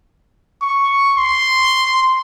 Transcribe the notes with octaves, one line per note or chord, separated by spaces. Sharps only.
C#6
C6